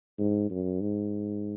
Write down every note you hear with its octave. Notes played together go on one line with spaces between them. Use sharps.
G#2
F#2
G#2